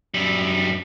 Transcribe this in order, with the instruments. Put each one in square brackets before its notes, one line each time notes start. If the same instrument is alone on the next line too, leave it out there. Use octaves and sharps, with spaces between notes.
[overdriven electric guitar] F#2 G3